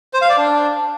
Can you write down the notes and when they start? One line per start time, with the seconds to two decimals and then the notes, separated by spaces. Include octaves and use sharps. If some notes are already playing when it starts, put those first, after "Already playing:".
0.13 C5
0.21 F5
0.29 D5
0.37 D4